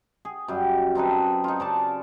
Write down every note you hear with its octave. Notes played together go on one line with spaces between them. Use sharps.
G#4
F#2 G3
C4 D#4 A4 B4
D#4 F4
C#3 D5 A5